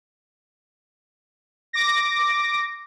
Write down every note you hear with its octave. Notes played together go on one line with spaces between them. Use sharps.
D6 A#6